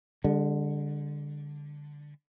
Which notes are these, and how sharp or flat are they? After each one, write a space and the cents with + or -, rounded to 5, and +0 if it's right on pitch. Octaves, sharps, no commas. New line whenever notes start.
D3 +0 G#3 -45